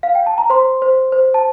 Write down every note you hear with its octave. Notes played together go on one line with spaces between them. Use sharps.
F5
G5
A5
A#5
C5 C6
C5
C5
A5